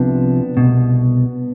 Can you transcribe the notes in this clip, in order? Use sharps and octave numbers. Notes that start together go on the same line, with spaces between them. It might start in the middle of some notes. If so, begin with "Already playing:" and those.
Already playing: C2 C3 F3 B3 D4
C2 B2